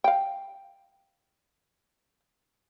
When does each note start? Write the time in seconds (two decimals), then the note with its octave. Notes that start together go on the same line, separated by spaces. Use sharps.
0.04 F5 G5